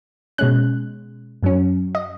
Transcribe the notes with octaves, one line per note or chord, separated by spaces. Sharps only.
B2 G#3 C#4 F#6
F#2 F#3 C#4
D#5